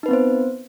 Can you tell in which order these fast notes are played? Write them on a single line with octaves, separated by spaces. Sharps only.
D#4 B4 C4 B3 C5